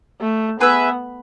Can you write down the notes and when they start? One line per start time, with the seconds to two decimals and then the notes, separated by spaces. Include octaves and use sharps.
0.20 A3
0.60 B3 G#4 B4 E5